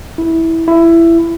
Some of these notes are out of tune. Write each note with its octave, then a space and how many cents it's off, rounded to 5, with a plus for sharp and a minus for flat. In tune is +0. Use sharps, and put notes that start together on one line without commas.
E4 -15
E4 +15